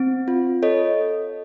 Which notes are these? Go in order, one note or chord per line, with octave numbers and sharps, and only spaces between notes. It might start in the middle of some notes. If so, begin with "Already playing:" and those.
Already playing: C4
F4
A4 C#5 D#5